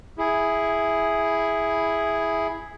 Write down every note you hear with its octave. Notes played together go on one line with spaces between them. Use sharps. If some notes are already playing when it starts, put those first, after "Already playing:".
E4 G#4